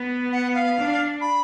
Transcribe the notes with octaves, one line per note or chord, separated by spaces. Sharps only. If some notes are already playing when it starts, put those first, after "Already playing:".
Already playing: B3
F#5
F5
D4
B5